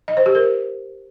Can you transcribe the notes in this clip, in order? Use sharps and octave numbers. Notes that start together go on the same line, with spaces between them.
D#5
C5
G4
A#4